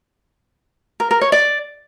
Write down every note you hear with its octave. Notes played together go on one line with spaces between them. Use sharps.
A#4
A#4
C#5
D5